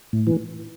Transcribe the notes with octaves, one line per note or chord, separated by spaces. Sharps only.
A2
E3